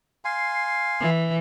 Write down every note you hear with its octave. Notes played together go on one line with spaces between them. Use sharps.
F5 G#5 C6
E3